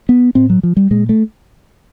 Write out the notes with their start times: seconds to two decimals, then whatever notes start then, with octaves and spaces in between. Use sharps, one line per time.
0.09 B3
0.35 A2 C4
0.50 F#3
0.63 F3
0.77 G3
0.91 A#2 G#3
1.09 A3